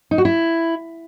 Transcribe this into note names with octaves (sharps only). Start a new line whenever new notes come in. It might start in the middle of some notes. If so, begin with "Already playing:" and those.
D#4
F#4
E4